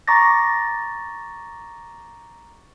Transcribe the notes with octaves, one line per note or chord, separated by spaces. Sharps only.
A#5 C#6 D6 A6 A#6